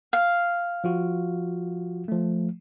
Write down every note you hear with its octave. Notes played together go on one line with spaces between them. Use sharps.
F5
F3 F4 F#4
F3 A3